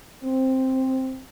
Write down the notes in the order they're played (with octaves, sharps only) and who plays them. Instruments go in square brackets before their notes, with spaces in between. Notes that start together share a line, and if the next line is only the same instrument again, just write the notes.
[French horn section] C4